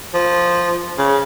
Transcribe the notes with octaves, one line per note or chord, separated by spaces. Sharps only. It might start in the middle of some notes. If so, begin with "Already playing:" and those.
F3
C#3